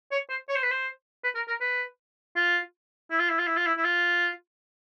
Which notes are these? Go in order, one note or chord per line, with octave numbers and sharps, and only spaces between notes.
C#5
C5
C#5
C5
B4
C5
B4
A#4
A#4
B4
F4
E4
F4
E4
F4
E4
F4
E4
E4
F4